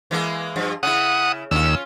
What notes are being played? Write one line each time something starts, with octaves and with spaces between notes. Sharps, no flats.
E3 G#3 A#3
G2 F3
C#3 E4 F#5 D#6
D#2 C#4 F4 E6